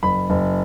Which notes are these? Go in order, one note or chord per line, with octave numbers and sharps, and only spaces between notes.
F#1 B5
F#1